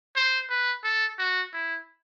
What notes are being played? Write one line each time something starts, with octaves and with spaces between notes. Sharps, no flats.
C5
B4
A4
F#4
E4